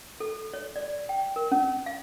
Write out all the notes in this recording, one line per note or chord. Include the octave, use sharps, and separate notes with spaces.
A4
C#5
D5
G5
A#4
C#4
F5